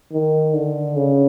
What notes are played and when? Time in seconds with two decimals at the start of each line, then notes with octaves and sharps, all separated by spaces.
0.12 D#3
0.54 D3
0.96 C#3